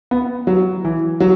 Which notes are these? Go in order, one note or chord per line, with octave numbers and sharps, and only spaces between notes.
B3
F#3
E3
F#3